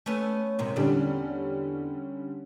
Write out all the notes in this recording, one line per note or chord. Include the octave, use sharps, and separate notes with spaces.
A3 B3 C#4
G#2 C3 D#3
E2 D3 G3 C#4 D4